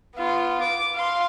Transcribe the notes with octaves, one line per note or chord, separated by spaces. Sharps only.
B3 F4
D6
F5 C6